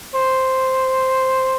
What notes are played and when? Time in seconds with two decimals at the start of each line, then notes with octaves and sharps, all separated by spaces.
0.15 C5